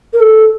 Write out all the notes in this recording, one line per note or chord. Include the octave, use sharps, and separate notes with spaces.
A#4
A4